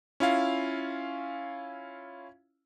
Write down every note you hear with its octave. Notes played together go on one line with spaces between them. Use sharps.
C#4 E4 F4 F5